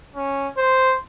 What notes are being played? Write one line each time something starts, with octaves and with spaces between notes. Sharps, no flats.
C#4
C5